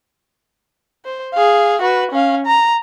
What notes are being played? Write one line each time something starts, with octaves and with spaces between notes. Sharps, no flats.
C5
G#4 F5
F#4 B4
C#4 F5
A#5